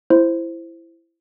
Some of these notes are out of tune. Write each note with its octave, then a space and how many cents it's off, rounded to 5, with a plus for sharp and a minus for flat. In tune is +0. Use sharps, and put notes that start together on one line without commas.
E4 +15 C5 +0